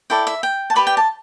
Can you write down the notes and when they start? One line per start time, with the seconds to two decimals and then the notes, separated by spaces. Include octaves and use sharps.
0.10 E4 A4 D5 G5
0.27 E5
0.43 G5
0.70 A5
0.75 G4 B4 D5 B5
0.87 G5
0.97 A5